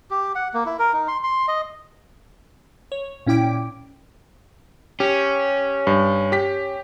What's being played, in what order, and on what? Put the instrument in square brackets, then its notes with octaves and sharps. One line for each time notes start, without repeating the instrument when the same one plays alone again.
[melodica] G4
F#5
A#3
E4
A#4
D#4
C6
C6
D#5
[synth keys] C#5
A#2 C#4 E4 G5 D6 D7
[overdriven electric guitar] C#4 [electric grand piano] G4
[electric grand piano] G2
G4 B6